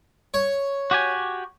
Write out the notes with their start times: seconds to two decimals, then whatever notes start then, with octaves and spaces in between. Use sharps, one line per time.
0.34 C#5
0.91 F#4 G4 G#5